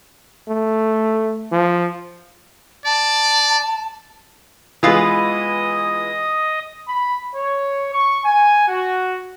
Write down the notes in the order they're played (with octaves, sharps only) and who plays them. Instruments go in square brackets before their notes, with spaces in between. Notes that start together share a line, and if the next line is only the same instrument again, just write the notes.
[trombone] A3
F3
[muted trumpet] D5 [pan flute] A5
[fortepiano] E3 G#3 [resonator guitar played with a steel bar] B3 F4 B4 [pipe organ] D#5 D#6
[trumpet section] B5
C#5
C#6
G#5
F#4